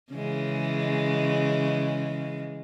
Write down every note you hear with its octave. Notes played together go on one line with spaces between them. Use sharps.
C#3 E3 G#3